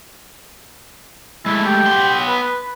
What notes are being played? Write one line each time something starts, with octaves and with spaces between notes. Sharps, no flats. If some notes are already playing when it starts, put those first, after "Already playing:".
G#3 A3 E4
G4
B3 C6
B4